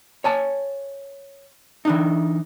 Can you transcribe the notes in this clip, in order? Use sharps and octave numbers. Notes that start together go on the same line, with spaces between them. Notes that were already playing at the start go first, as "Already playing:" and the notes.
C#5 G#5 A5
E3 D4 D#4